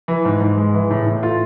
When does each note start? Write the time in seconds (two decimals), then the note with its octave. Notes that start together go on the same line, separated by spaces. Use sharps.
0.08 E3
0.25 G#2
0.40 G#2
0.57 G#3
0.74 E3
0.91 A2
1.06 A2
1.23 A3 F4